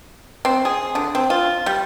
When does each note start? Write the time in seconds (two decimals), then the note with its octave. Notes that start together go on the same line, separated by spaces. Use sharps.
0.45 C4
0.65 G#4
0.95 D3
1.15 C4
1.30 F4
1.66 G3